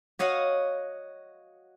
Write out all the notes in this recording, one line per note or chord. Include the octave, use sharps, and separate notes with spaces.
F#4 C#5 D#5 F5 F#5